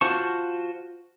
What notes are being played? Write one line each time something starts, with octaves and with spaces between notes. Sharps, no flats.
F4 F#4 C5 A5 C#6